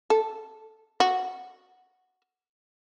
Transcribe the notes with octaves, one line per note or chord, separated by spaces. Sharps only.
A4
F#4